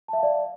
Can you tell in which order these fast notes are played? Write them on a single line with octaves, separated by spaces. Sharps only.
A5 E5 F5 D5